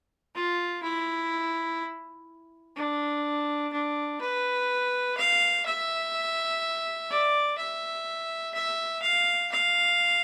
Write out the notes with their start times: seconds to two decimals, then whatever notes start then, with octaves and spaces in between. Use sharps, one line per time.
0.35 F4
0.83 E4
2.76 D4
3.72 D4
4.21 B4
5.17 F5
5.65 E5
7.10 D5
7.57 E5
8.54 E5
9.02 F5
9.51 F5